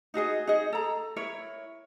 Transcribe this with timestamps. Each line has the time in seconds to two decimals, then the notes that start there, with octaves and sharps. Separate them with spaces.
0.14 D#4 F#4 G#4 D#5
0.47 D#4 G#4 D#5
0.73 A4 A#5
1.16 E4 A#4 C#5